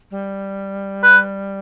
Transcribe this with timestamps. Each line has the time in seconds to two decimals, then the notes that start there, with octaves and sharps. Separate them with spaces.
0.11 G3
1.03 B4